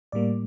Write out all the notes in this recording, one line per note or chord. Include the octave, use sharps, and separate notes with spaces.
A2 G3 A#3 D5